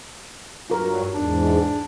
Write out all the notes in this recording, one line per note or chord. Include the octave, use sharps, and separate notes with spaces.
G2 F#3 F4 A#4
E2 G#2 D4